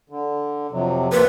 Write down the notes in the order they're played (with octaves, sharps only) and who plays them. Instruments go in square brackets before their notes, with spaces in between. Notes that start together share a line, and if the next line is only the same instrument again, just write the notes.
[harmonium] D3
F2 C3 F#3
[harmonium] D2 A#3 C4 [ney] B4